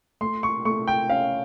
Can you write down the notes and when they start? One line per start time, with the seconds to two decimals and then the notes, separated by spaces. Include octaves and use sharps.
0.21 A3 C6
0.43 C#6
0.65 A3 C#6
0.87 G5
1.09 C#4 F5